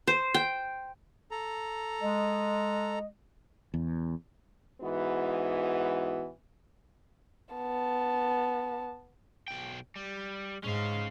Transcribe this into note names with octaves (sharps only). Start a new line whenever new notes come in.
C5
G5
A4 A#5
G#3 D#5
E2
G#2 E3 B3 F#4
B3 A5
B1 G5
G3
G#2 C#4 F5